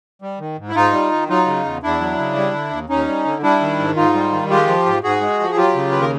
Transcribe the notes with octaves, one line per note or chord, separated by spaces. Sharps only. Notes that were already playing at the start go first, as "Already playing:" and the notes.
G3
D#3
G#2
E4
G#2 D#4 F4
G3
D#3
F#3 D#4 F4
C#3
E2
E2 D4 E4
F#3
C#3
G3
D3
D#2
D#2 C#4 D#4
G3
D3
G3 D4 E4
D#3
G#2
G#2 D#4 F4
G3
D#3
G#3 F4 G4
F3
G#2
G#2 F#4 G#4
G#3
F3
G#4
F#3 F4 G4
C#3
D#2 B4
A#4